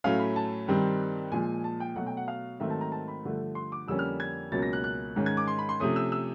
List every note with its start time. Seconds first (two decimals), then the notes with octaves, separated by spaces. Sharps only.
0.04 A2 F#3 A3 C#4 F5
0.20 B5
0.36 A5
0.68 G2 D#3 G3 C4
1.32 A#2 F3 G#3 G#5
1.64 A5
1.80 G5
1.96 B2 F#3 A3 F#5
2.06 G5
2.17 F#5
2.28 F5
2.60 G#2 D#3 F#3 A3 C4 E5
2.70 A5
2.81 A#5
2.92 A5
3.08 B5
3.24 G2 D3 F3 A3
3.55 C6
3.72 D6
3.88 F2 D3 G3 A#3 C#4 E6
3.99 F6
4.20 G#6
4.52 C#2 B2 F#3 A#3 C#4 A6
4.62 A#6
4.73 F#6
4.84 F#6
5.16 G#2 D#3 G#3 C#4
5.26 G#6
5.37 D6
5.48 C6
5.59 B5
5.69 C6
5.80 C3 F3 A3 C#4 D#6
5.96 E6
6.12 E6